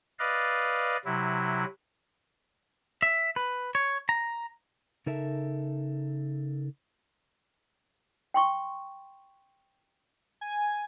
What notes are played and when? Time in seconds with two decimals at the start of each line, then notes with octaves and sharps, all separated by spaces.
0.19 B4 D5 D#5 F5
1.05 C3 F#3 E4
3.02 E5
3.36 B4
3.75 C#5
4.09 A#5
5.06 C#3 D#4 A4 A#4 E5 A5
8.34 G5 C6 C#6
10.41 G#5